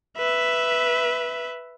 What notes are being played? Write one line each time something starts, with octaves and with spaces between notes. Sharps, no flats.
B4 E5